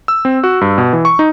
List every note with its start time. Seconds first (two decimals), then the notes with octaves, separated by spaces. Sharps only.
0.08 E6
0.25 C4
0.44 F#4
0.61 G2
0.78 B2
0.93 E3
1.05 C#6
1.19 D#4